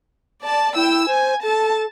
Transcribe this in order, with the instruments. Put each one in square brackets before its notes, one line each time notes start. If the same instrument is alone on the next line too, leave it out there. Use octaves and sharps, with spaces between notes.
[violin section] D5 A5
[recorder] E4 [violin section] G5 E6
[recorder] C5 [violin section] G#5
[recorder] A4 [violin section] A5